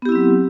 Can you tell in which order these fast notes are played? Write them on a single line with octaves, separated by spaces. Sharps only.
B3 G4 E4 C4 F#3